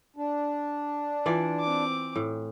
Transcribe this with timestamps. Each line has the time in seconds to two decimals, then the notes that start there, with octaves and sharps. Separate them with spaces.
0.16 D4
1.26 E3 F4 D5
1.60 C4 D6
2.16 A2